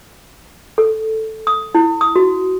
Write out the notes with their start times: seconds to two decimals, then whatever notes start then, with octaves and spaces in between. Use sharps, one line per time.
0.78 A4
1.47 D#6
1.75 E4
2.01 D#6
2.16 F#4